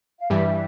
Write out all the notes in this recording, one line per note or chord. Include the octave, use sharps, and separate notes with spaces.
F5
G2 E3 G3 E5